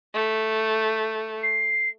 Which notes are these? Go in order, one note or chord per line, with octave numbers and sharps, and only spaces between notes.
A3
C7